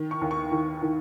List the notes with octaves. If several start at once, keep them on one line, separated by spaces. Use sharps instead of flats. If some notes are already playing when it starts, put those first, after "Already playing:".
Already playing: D#3
C#6
D#2
C#6
D#3
D#3